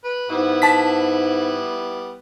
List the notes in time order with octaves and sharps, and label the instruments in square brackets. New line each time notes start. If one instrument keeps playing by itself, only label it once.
[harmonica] B4
[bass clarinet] G#2 [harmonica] G3 B3 E4
[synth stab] A5 B6